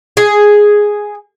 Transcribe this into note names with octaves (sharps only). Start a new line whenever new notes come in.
G#4